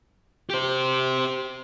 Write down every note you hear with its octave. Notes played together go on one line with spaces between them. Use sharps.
G4 C5